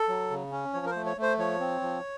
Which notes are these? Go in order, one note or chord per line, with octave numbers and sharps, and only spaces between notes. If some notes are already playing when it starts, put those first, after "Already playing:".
Already playing: A4
F#3
C#3
C#4
F3 C#5
A#4
A3 C5
C#5
A3
C5
F3 C#5
C4
F3